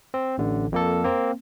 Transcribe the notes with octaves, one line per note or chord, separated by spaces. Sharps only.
C4
A1 D3
F2 A#3 A4
A#3 C4